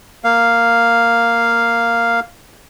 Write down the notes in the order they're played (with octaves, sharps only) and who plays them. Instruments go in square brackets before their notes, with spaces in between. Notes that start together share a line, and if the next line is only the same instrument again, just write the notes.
[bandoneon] A#3 F5